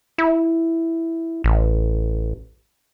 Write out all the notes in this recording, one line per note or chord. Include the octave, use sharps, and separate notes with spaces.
E4
A1